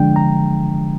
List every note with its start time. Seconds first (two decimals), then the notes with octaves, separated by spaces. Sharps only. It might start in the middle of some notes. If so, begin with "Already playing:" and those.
Already playing: D3 F3 G#3 D4 G5
0.16 A#5